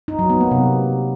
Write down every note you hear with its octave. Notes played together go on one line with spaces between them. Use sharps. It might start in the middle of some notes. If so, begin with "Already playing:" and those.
D#4
F#3
B3
A#3
C3